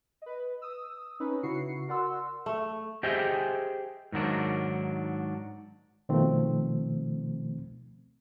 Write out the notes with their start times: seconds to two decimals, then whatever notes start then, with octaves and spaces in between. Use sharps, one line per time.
0.22 B4 D#5
0.62 D#6 E6
1.20 C4 C#4 D#4 B4
1.43 C#3 E4 F#4 C7 C#7
1.88 F#4 A#4 D5 F#5 C6 E6
2.46 A3
3.03 G4 G#4 C5 D#5 E5 G5
4.12 G#2 D#3 F#3 D4
6.09 B2 D#3 F3 A3 C4